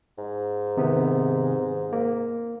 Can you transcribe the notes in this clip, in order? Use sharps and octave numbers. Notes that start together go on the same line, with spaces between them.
G#2
C3 D#3 B3
A#3